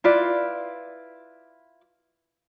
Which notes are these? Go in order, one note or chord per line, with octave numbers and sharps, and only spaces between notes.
E4 F4 B4 D5